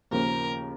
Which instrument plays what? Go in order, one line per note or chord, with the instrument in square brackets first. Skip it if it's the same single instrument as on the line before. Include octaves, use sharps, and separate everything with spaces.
[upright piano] D#2 C#3 F3 A#3 [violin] A#4